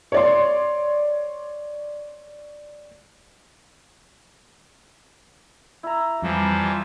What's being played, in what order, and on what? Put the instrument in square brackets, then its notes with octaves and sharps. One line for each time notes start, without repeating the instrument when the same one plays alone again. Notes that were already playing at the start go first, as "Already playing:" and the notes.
[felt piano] C#5 D5 C6
[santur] E4 A#5
[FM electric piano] F2 [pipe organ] E3 F3 [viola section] G3